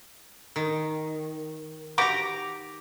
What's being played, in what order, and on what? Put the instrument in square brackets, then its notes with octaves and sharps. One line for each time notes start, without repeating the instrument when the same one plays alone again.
[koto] D#3
[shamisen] F#4 [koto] G4 A#5 [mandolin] D6